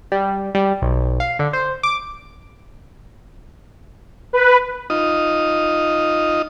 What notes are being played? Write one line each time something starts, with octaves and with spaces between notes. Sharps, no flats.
G3
G3
B1
F5
D3
C5
D6
B4
D#4 F4 D#5